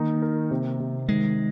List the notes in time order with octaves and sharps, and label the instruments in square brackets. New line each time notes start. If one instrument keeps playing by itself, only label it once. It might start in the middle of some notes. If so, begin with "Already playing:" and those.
Already playing: [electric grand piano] D#3 D#4 [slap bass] A#3
[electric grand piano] A#4
C3
C3
[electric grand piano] D#3 [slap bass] G#3